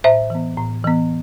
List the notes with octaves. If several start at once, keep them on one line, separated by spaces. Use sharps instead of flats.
A2 C5 E5
E3 B3
A2
E3 B3